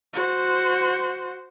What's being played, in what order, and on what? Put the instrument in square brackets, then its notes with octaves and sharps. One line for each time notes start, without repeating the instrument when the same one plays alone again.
[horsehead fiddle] F#4 C5